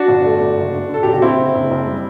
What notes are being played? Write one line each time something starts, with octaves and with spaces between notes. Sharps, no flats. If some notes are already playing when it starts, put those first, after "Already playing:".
Already playing: D4 F#4
G1
A3
G1
F#1
D3
D3 A4
F#1 G4
F#4
F#1 C4 E4
D3
F#1
F#1
G3